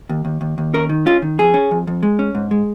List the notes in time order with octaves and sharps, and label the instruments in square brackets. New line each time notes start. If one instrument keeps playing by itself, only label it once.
[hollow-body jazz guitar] D#2
D#2
D#2
D#2
C#4 A#4
D#3
C#4 F4
D#3
F2 G#4
C#4
F2
F2
G#3
C#4
G#2
G#3